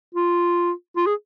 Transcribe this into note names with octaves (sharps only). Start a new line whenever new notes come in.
F4
F4
G#4